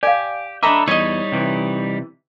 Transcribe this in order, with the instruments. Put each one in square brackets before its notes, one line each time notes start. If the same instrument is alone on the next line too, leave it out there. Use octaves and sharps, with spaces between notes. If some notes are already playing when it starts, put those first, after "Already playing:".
[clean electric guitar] G4 [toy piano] D5 F5 [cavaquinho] G#5
[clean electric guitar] D4 A4 E5 [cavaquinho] D#5 A#5 B5 [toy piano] D6
[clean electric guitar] E2 [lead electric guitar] G3 D#4 [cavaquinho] C#5 D#5
[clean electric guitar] C3 E3